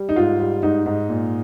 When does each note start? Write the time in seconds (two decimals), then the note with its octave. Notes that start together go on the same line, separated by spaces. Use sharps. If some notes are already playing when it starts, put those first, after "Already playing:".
Already playing: G3
0.09 D#4
0.16 G#2 F4
0.40 G3
0.63 G#2 D#4
0.86 G#2
1.09 A#2